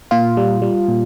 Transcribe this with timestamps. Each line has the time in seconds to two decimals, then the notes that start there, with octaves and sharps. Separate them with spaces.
0.11 A#2 F4
0.37 G3
0.62 G3
0.88 A#2